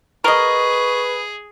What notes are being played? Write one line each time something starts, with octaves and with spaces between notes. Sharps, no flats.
G#4 A#4 B4 D#5 C#6